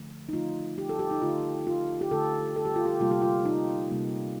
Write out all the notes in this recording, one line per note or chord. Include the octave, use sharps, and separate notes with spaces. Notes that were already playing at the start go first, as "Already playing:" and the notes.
Already playing: D3 F3 A3
D#4
D3 F3 A3 F4
G4
A4
G4
D#4
D3 A3 F4
F4
G4
D3 A3 A4
A4
G4
F4
G4
C3 G3 A#3 F4
G4
F4
D#4
C3 G3 A#3